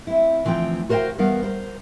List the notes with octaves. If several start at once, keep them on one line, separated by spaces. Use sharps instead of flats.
C4 E4
D2 E3 F3 C4 G5 A#5
F#4 A#4 C5 C#5 F5 G5
E2 G3 B3 A#4 F5 F#5
A#4 C5